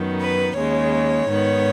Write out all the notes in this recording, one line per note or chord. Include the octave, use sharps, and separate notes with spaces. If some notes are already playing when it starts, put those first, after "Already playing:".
Already playing: F#2 D#3 B3
B4
D#2 C#3 G#3 C#5
G#2 D#3 B3